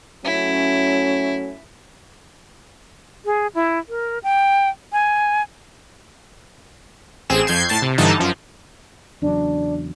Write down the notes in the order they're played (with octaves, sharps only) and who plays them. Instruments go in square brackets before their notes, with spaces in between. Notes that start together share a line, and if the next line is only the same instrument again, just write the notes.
[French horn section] F#3 A3 C#4 [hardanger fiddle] E4
[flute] G#4
E4
A#4
G5
G#5
[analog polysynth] A1 C4 G#4 E7
F2 G6 G#6 C7
A2 A5 A6 C7
C3
G2 D3 E3 D#4 A5
F#2 F3
[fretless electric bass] E2 C#3 F#3 [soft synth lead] D4